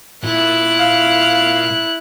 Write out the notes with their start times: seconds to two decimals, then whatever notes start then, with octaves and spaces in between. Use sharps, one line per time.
0.23 A#2 E4 F#6
0.79 F5